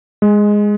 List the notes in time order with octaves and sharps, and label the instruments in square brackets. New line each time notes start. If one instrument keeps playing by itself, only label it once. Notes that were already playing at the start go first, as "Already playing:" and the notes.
[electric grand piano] G#3